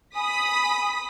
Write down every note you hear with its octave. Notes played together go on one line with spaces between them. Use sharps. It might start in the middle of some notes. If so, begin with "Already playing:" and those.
G#5 B5 D#6 B6